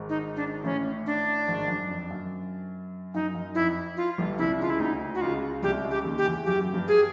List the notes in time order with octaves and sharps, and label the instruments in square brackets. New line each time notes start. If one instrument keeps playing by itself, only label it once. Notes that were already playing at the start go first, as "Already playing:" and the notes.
Already playing: [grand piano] G#1 G#2
[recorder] D#4
D4
[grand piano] A1 A2 [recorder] C#4
[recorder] D4
[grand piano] G#1 G#2
F#2
F2
F#2
[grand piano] F#2 [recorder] D#4
[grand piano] F#2
[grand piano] F2 [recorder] E4
[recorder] F4
[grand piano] G1 G2
[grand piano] C2 C3 [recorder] E4
[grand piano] C#2 C#3 [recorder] F4
[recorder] E4
[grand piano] D2 D3 [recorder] D#4
[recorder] F#4
[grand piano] C#2 C#3 [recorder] F4
[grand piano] C2 C3 [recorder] G4
[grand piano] C#2 C#3
[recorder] G4
[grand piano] D#2 D#3
[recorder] G4
[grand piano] E2 E3
[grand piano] F#2 F#3 [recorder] G4
[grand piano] G2 G3
[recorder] G#4